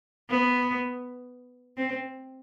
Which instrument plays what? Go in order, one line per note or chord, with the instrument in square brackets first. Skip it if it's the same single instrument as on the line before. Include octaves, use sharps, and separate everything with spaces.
[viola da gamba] B3
C4